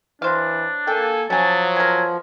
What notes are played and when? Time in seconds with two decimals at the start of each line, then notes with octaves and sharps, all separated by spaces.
0.22 E3 F#3 D4 C5 F5
0.87 A#3 A4 G5 G#5
1.30 F3 F#3 C#4 G#5 A5
1.76 B2 A#4 G#5